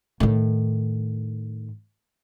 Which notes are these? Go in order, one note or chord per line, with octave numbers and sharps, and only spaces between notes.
A2 D#3